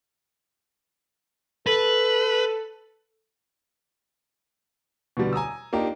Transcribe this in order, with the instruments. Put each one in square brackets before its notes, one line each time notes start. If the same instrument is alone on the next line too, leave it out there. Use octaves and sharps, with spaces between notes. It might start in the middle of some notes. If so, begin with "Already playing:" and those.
[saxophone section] A4 [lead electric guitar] B4
[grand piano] B2 D3 G3
G#5 A#5 D#6 E6
A#3 D4 D#4 F4 G4